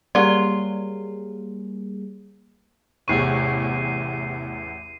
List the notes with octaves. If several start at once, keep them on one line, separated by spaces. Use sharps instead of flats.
F#3 G3 A#3 F4 G#4 D5
A1 E2 C3 G#4 C#6 C7 D#7